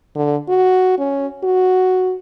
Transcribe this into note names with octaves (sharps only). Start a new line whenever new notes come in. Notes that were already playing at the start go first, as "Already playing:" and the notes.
D3
F#4
C#4
F#4